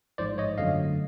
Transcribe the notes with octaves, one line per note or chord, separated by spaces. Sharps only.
A1 G#2 F3 C5 D5
C#5 D#5
F#2 D3 F#3 A3 D#5 F5